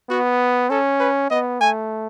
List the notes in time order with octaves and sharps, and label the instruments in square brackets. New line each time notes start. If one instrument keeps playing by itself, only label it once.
[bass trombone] B3 [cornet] F#4
[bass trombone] C#4 [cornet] A4
[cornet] B4
[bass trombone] B3 [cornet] D#5
[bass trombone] A3 [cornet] G#5